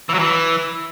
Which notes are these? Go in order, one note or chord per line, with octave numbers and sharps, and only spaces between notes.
E3
F#3
E3